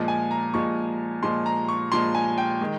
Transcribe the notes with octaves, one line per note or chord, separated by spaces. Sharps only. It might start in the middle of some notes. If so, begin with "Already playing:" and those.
Already playing: A#2 F3 G#3
G#5
A#5
A#2 F3 G#3 C#6
A#2 F3 G#3 C6
A#5
C#6
A#2 F3 G#3 C6
G#5
G5
D#3 G#3